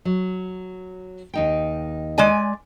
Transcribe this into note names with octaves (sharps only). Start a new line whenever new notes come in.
F#3
D#2 D#4 G5
G#3 D5 G#5